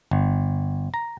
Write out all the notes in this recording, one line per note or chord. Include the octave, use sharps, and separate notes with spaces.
G1
A#5